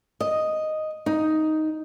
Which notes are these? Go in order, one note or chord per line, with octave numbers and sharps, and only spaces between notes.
D#5
D#4